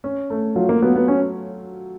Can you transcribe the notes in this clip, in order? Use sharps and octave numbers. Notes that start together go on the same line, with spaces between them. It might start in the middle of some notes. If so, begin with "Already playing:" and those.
C#4
A3
F#3 F4
A#3
F#3 B3
B3
C#4